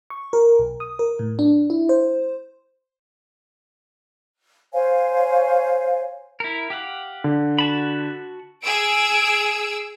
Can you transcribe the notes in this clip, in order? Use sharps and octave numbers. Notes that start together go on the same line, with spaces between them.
C#6
A#4
B1
D#6
A#4
A2
D4
E4
C5
C5 C#5 F5 G#5
E4 A#4
G4 F5 F#5
D3
F#4 A5 B5
G#4 E6 D7